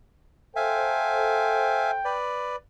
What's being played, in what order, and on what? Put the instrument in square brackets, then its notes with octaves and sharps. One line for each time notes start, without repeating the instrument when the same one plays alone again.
[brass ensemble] A4 C5 [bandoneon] E5 F5 G#5 [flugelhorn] G5
[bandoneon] B4 D5